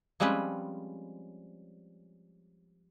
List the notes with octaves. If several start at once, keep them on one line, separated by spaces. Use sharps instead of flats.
F3 G3 G#3 C4 C#4 B4